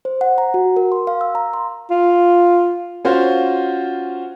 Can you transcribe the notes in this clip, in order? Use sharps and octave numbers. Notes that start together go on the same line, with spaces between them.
C5
F#5
A#5
F#4
A#4
C6
F5
E6
A#5
C6
F4
C#4 F4 F#4 C5